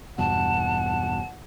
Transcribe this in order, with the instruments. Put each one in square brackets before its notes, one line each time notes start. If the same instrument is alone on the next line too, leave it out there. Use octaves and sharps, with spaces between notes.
[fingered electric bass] E2 G2 B2 [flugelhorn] F#5 [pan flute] A5